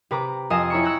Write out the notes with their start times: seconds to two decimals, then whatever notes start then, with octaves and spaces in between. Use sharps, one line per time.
0.11 C3 B4 A#5 D6
0.50 F2 D#5 F5 G#5 A#6 E7
0.70 E4 C#5 A#5 C#6
0.83 E6 F#6 G#6 A#6 C#7